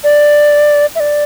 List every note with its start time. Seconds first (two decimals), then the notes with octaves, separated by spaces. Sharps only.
0.04 D5
0.95 E5
1.00 D5